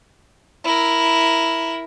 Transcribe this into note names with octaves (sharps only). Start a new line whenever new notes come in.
E4 A#4